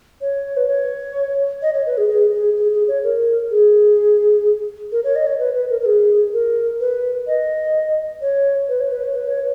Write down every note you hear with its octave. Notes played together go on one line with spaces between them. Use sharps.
C#5
B4
C#5
D#5
C#5
B4
G#4
G#4
G#4
G#4
G#4
C#5
A#4
G#4
A#4
C#5
D#5
C#5
B4
B4
A#4
A#4
G#4
A#4
B4
D#5
C#5
B4
C#5
B4
C#5
B4
C#5